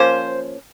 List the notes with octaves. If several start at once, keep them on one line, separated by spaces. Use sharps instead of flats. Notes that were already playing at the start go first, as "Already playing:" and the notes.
Already playing: F3 A#3 C#4 C5